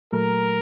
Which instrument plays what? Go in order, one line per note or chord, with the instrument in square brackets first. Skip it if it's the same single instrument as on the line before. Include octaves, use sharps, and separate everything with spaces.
[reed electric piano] A#2 F#3 A3 [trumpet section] A#4